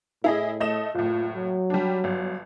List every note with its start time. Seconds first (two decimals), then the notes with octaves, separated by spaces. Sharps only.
0.24 A2 E4 G#4 D#5
0.60 A3 D#5 E7
0.95 F#1 A2 F4
1.36 F#3
1.70 G3 D4
2.04 G1